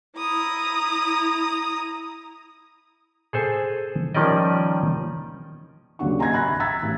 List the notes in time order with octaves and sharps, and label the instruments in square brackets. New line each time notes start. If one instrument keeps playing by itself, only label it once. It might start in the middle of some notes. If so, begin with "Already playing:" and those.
[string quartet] E4 A#5 D#6
[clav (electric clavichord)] G#4 A4 C5 G#5
D#3 F3 G3 C#4 D5 D#5
[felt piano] D#2 C#3 F#3 D4 F#5 C#6
G#5 A#5 C6 C#6 G#6 A#6
E5 G#5 B5 F#6 A#6
A#5 E6 G#6 A6 B6
A1